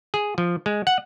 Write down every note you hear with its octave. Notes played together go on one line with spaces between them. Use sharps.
G#4
F3
G#3
F#5